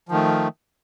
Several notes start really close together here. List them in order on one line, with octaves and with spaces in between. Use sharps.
F3 D#3 A3